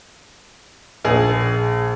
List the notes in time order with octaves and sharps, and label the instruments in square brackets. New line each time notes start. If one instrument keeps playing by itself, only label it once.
[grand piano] A#1 G#4